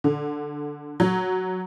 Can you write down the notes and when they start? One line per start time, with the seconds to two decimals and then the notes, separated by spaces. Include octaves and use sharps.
0.04 D3
1.00 F#3